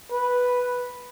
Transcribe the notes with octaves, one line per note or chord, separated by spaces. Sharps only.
B4